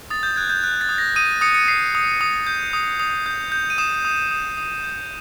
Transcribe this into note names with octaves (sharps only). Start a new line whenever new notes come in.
D#6 A6
G6
F#6 G#6
G6
F#6
A6
D#6
A#6
D#6 D#7
D#6 C#7
C#7
D#6 C7
D#6
D#6
G6
D#6
D#6
G6
G6
D#7
D#6 E7
D#6
D#6
D#6
G6